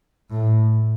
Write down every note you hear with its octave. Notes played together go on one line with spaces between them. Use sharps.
A2